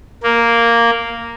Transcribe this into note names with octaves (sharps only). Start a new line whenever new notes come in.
A#3